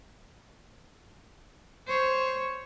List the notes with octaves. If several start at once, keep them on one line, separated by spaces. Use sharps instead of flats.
C5 C#5